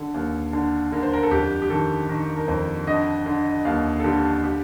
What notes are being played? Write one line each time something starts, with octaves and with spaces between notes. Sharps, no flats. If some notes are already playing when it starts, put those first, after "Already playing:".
Already playing: D3 A4
D#2
D3
D3 A#4
C5
A#4
A4
F2 G4
G4
D#3 A4
D#3 A#4
A#4
F2 C5
D3 D#5
D3
D#2 F5
A4
D3 G4
G4